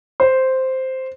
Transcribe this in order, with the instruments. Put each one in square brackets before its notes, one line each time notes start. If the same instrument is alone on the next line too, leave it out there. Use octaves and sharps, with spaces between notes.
[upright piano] C5